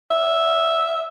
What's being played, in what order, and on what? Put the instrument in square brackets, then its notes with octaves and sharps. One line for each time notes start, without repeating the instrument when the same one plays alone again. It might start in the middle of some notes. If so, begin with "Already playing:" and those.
[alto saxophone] E5